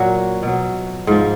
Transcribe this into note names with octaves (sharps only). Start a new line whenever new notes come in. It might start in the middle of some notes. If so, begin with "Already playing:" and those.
Already playing: A#2 F#3 F#4
B2 F#3
G#2 F3